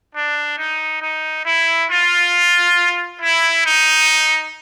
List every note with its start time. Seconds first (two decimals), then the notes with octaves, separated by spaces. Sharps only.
0.15 D4
0.58 D#4
1.01 D#4
1.45 E4
1.90 F4
3.21 E4
3.65 D#4